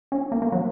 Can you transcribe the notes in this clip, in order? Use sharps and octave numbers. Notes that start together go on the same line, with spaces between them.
C#4
A#3
A#3
F#3